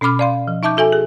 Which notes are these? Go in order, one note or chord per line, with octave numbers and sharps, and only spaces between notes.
B2 C#4 B5 D6 F6
D5 F5 C6
F3
D#4 E5 A5 D6 G6
F#4 A4 E5 G#5
G#4